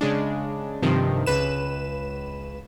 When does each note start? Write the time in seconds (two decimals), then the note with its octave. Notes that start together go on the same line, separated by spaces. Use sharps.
0.01 C#3 G#3 D4
0.82 G2 C3 D#3 F3
1.26 C#2 B4 E7